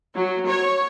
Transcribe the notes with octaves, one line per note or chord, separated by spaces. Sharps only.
F#3
C#5